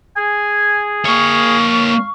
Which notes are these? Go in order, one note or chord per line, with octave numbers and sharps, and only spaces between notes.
G#4 G#5
A#3 C#5 F5 C#6